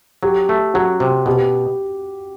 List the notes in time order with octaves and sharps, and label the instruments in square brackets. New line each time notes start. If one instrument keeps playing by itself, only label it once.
[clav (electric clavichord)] F#3 [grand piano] G4
[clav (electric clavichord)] A3
[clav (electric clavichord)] F#3 [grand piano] F#4
[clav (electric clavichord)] C3
[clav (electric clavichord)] B2 [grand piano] G4